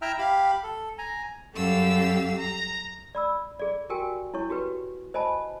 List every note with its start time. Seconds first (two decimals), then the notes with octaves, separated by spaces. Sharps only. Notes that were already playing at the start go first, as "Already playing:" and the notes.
0.02 E4 E5 G5 A#5 E6 F6
0.19 G4 F5 B5
0.63 A4
0.98 G#5 A#5
1.55 F#2 G3 G4 A4 F5 E6
2.39 A#5
3.15 D5 B5 E6
3.59 G#4 D5
3.90 F#4 G4 A#4 G5 G#5
4.34 E4 C#5 C#6
4.50 F#4 G4 B4
5.14 C5 D#5 G#5 A5 B5